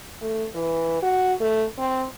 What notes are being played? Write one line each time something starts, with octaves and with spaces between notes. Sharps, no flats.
A3
E3
F#4
A3
C4